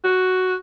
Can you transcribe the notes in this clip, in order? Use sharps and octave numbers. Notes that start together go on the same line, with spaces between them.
F#4